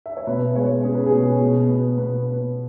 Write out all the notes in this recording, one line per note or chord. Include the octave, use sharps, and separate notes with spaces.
E5
C#5
B2 B4
G#3 C#5
C#4 G#4
B4
G#4
B2
B2
B3
B2 B4
B3